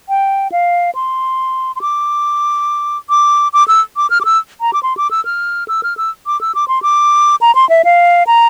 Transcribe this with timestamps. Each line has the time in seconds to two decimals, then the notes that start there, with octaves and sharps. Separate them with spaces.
0.09 G5
0.52 F5
0.95 C6
1.76 C6
1.81 D6
3.09 D6
3.53 D6
3.68 E6
3.96 D6
4.10 F6
4.21 D6
4.25 E6
4.61 A#5
4.73 D6
4.83 C6
4.97 D6
5.11 E6
5.25 F6
5.68 E6
5.83 F6
5.97 E6
6.26 D6
6.41 E6
6.55 D6
6.68 C6
6.82 D6
7.41 A#5
7.55 C6
7.69 E5
7.85 F5
8.27 A#5